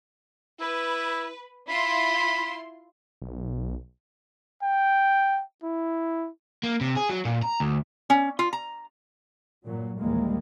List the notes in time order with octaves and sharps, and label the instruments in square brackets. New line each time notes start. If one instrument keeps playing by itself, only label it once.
[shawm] E4 [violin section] B4
[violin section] E4 F4 C6 [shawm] B5
[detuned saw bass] B1
[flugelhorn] G5
E4
[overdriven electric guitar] A#3
C3
G#4
F#3
A#2
A#5
D2
[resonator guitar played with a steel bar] C#4
F4
A#5
[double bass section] G2 A#2 F#3
A#1 D#2 E3 G3 G#3 A#3